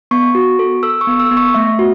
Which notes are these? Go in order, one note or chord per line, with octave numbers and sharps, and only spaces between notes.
B3 C#6
F#4
A4
A4 E6
C#6
B3
E6
B3
C#6
A3 E5
F#4